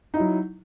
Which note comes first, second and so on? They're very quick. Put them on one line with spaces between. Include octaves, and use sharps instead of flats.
D#4 E4 F#3